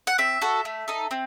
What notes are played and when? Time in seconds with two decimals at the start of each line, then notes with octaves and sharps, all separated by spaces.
0.07 F#5
0.18 C4 E5
0.42 F#4 A4
0.65 A3
0.88 D#4 A4
1.11 C4